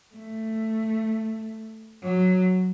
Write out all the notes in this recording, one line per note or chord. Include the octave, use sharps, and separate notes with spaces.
A3
F#3